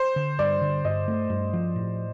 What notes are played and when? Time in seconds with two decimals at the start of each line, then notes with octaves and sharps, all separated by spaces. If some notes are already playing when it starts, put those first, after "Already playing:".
Already playing: C5
0.16 D3
0.39 G2 D5
0.61 D3
0.85 G2 D#5
1.08 A3
1.30 G2
1.53 F3
1.76 A2